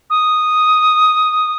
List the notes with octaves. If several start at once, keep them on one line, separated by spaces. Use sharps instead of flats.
D#6